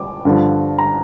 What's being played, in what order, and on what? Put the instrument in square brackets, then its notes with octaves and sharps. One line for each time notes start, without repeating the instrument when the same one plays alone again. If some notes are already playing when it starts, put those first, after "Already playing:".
Already playing: [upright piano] D6
G2 D3 F3
A#5